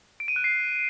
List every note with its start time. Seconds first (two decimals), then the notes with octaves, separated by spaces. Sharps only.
0.20 D7
0.28 D#7
0.36 F#6
0.44 C7